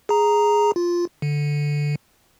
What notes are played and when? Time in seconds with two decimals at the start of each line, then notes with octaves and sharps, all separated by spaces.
0.09 G#4 A#5
0.76 F4
1.22 D3